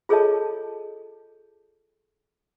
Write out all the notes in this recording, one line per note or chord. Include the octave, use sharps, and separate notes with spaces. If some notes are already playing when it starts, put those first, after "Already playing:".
F4 G#4 A4 C#5 D#5 A5